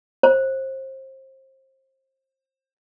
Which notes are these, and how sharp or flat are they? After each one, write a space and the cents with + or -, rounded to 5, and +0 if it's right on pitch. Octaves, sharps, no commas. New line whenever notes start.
C5 +25